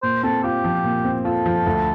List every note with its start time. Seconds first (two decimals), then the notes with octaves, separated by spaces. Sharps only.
0.02 A#2 C5
0.24 C4 A4
0.43 F4 G4
0.64 F3
0.84 A#2
1.04 C4
1.25 F4 A4
1.46 F3
1.67 D2